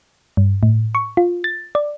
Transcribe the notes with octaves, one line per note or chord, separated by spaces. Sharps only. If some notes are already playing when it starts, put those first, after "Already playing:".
G2
A2
C#6
F4
A6
D5